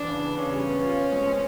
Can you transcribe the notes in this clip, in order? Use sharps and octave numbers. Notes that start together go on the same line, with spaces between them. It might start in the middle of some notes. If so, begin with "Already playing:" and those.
Already playing: E3 D4
C#3
B3
C#3 C#4
G3
B3
F4
C4
G#3
G#3